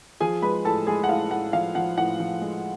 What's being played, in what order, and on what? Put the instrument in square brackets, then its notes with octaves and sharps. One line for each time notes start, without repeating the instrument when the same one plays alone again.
[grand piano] F3 G#4 G#5
G#3 B4 B5
A2 A4 A5
G#3 G#4 G#5
F#5
A2 F5
A2 F#5
F3 F5
F3 F#5
A2 F#5
F3
G#3